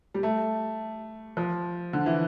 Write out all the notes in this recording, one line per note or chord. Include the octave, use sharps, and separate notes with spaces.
G3
A3
F3
D3
E3